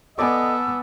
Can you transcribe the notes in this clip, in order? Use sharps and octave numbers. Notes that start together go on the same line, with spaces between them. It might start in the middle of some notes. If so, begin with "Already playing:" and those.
B3 A4 D5 D#5 G#5 A5 E6